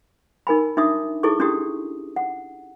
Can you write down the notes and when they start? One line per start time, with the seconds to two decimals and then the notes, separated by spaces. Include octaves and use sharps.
0.47 D#4 A#4 G#5 B5
0.77 D4 D#4 F#4 E5 D6 D#6
1.23 D#4 E4 G#4 A4 C#6 D6
1.40 C#4 D4 E4 F#4 G4 D#6
2.16 F#5